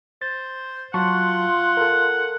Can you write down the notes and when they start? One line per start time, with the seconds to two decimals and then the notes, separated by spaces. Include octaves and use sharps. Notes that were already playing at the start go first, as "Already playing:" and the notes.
0.22 C5 A6
0.94 F#3 F4 F#5 A5 C6 C#6
1.77 A4 A#4